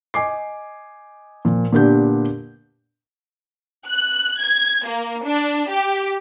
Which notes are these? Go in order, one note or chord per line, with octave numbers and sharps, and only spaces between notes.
D#5 G#5 D6 C7
A#2 F3
A#2 D3 B3 D4 G4 G6
F#6
G#6
A#3
D4
G4